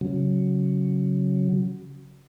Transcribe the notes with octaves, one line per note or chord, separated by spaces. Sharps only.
C#3 F#3